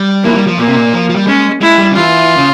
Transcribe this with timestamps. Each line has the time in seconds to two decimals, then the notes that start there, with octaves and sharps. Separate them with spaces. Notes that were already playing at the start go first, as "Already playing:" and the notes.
Already playing: G3
0.23 E3 A#3
0.30 F3
0.35 G3
0.47 F3
0.58 A#2 A#3
0.67 C3
0.75 A#2
0.93 F3
1.09 F3
1.16 G3
1.27 G#3 C#4
1.61 G#3 E4
1.78 G3
1.91 C#3
1.96 E3 F4
2.38 C#3